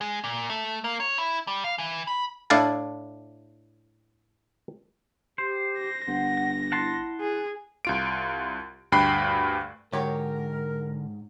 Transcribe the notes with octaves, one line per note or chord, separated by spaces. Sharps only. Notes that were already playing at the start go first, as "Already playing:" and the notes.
G#3
A#2
A3
A#3
C#5
E4
G3
F5
E3
B5
A2 D4 E4 F5 A5
G4 C5
A#6
G1 F#5
E4 F#5 A5 C6
G#4
C2 F4 D7
D2 G2 G5 B5 F#6 C7
G#2 D3 F#3 G4 A#4 C#5